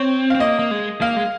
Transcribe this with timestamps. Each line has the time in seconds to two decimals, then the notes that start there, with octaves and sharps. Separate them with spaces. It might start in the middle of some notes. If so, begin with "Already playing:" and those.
Already playing: C4 C#5
0.30 C4 F5
0.40 A#3 D#5
0.59 A#3
0.71 G#3
1.01 A#3 F5
1.16 G#3